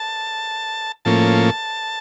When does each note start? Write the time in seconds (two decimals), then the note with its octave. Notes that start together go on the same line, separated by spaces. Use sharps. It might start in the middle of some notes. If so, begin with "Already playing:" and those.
Already playing: A5
1.05 A2 F3 A#3 C#4 A5